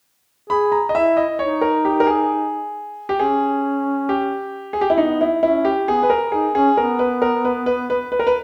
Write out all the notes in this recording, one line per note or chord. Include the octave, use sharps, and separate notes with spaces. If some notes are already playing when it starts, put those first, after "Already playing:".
G#4 B5
A#5
D#5
E4 E5
D#5
D#4 C#5
A#4
G4
A#4
G#4
G4
C#4 G#4
G4
G#4
G4
E4
B3 D#4
E4
C#4 E4
G4
B3 G#4
B4
A#4
D#4 G#4
C#4 G#4
B3 A#4
B4
A#4
B4
B4
B4
B4
A#4
B4